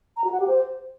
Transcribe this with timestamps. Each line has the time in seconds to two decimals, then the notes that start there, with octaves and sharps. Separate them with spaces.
0.17 A#5
0.24 F#4
0.32 F#5
0.40 G4
0.48 C5